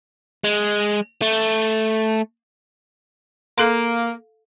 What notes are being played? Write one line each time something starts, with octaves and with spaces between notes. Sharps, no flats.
G#3
A3
A#3 A4 F5 C6